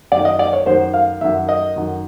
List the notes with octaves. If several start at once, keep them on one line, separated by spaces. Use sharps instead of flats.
F#2 D#3 D5
D#5
D5
C#5
F#2 D#3 C5
F5
F#2 D#3 E5
D#5
F#2 D#3